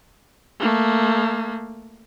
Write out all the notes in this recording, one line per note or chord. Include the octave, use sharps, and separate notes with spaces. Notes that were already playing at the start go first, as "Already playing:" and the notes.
A3 A#3